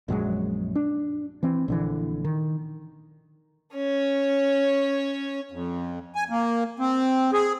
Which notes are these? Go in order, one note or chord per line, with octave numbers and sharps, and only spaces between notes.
A#1 F#2 F#3 G#3
D4
E3 C4
A#1 D3 E3
D#3
C#4 C#5
F2
G#5
A#3
C4
G#4